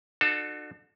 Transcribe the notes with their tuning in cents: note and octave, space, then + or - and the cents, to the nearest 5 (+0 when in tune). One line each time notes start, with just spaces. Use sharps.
D4 +40 F#4 -25 A4 +0